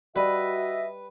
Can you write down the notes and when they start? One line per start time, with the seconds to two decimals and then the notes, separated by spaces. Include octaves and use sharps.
0.16 G3 F#4 B4 D#5 E5